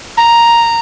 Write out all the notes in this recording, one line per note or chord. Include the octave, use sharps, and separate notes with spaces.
A#5